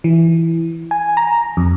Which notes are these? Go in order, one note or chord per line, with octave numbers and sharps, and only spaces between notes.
E3
G#5
A#5
F2